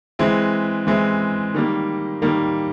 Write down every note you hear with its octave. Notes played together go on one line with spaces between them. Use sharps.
E3 G#3 C4 E4
E3 G#3 C4 E4
D#3 G3 A#3
D#3 G3 A#3